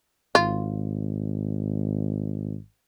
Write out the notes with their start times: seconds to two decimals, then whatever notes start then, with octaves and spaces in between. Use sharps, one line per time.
0.35 G#1 F4